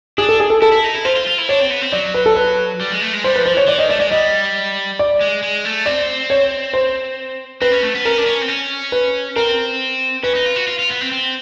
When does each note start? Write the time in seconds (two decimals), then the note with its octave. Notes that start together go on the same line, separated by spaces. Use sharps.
0.18 D4 G#4
0.29 A4
0.40 G#4
0.50 A4
0.62 E4 A4
0.72 E4
0.84 D#4
0.95 E4
1.05 F4 C5
1.16 F4
1.27 F4
1.38 E4
1.49 D4 C#5
1.60 C4
1.70 B3
1.82 C4
1.92 F#3 D5
2.14 B4
2.26 A4
2.36 B4
2.81 G3
2.92 G#3
3.02 A3
3.13 G#3
3.24 G3 C5
3.35 B4
3.38 F3
3.46 C5
3.53 E3 C#5
3.67 E3 D5
3.79 D#3 D#5
3.89 A3 D5
4.00 G#3 D5
4.11 G3 D#5
4.99 D5
5.21 G#3
5.42 G#3
5.65 A3
5.86 C4 D5
6.30 C#5
6.74 C5
7.61 C4 B4
7.72 C#4
7.83 A3
7.95 B3
8.05 C#4 A#4
8.18 D4
8.26 C#4
8.41 C4
8.48 C#4
8.92 B4
9.36 C4 A#4
10.23 C#4 B4
10.35 D#4
10.46 F4
10.56 F#4
10.67 F4
10.79 F4
10.90 B3
11.01 C4
11.12 C4